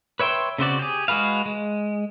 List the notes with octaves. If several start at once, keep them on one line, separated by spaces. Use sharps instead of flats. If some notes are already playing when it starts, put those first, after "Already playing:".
B4 C#5 E5 G5 C6
C#3 C4 F#4 D5
G4 G#4
G#3 F#4 G#4 B4 F5
G#3